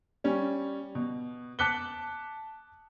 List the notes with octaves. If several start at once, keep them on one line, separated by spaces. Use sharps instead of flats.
G3 C#4
B2
A5 D6 F#6 B6 C#7 G7